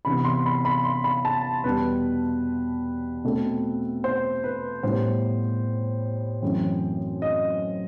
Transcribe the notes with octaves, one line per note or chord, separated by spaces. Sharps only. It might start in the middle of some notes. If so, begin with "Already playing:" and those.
C3 E3 B3 B5
C6
B5
B5
C6
B5
A5
E2 B2 G3 B4
B2 A3 C4
C5
B4
A2 G3 B3 C5
F#2 E3 A3 C4
D#5